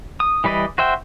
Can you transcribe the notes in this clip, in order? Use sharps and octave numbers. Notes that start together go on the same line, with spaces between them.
D#6
E3 G3 B4 D5 D#5
F#4 C5 E5 G5